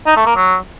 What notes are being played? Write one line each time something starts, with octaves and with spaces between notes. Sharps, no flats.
D#4
A3
A#3
F#3